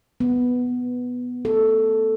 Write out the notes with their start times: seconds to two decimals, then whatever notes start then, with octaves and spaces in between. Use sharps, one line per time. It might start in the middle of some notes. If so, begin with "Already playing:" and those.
0.20 B3
1.45 A4